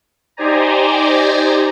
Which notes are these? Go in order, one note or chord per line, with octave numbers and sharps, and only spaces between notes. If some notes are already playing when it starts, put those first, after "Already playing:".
D#4 G4 C5 D5 G#5 A#5